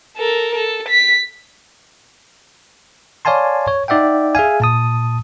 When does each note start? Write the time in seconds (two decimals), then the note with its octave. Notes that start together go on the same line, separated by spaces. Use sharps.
0.18 A4 A#4
0.55 A4
0.89 B6
3.25 C#5 D5 F5 G#5 A5 C6
3.67 C#5
3.88 D#4 D5 E5 F#5 G5
4.35 G#4 E5 F5 G#5
4.60 A#2 A5 D#6